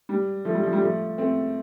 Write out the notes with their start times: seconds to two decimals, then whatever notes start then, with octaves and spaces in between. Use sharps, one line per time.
0.09 G3
0.45 F3 A3
0.54 G3
0.63 F3
0.73 G3
0.82 F3 A3
1.18 A3 C4